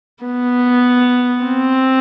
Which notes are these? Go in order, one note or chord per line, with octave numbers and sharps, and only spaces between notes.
B3
C4